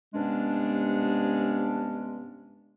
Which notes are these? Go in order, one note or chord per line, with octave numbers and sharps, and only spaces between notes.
G2 C3 G#3 B3 C#4 D4